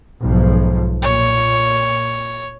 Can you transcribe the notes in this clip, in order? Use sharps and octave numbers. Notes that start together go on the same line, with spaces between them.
B1 G#2 F3
A#2 C#5